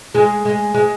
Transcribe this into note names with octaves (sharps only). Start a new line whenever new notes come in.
G#3
G#3
G#3